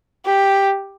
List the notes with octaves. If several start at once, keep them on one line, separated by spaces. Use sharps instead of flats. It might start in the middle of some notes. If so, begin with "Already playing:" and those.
G4